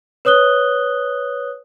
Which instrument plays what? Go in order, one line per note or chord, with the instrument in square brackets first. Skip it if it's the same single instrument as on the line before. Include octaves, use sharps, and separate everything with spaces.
[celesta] B4 C#5 D#6 F#6 G7